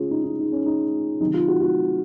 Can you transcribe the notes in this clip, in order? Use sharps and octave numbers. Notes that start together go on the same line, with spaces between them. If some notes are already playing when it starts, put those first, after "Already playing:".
Already playing: C#3 G#3 C#4 F4 G#4
D#4
D#4
D#4
C#4
D#4
C3 D#3 F#3 D#4
F4
F#4
F#4